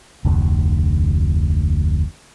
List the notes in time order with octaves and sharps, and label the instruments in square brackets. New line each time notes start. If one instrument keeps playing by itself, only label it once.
[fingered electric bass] F1 D2